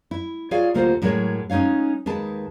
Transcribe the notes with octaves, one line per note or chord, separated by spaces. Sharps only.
E4
F4 G#4 C#5 D5 F5
D2 C3 A#3 F4 A4 C5
A2 F#3 G#3 A#4 C5 C#5
G#3 C#4 D#4 C#5 F5
D#2 G#3 B4 A5